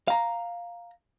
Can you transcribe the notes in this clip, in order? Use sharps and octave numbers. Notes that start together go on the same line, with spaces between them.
F5 A#5